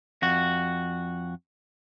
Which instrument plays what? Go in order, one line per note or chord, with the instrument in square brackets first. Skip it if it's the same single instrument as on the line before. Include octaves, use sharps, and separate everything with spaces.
[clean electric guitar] F2 F#4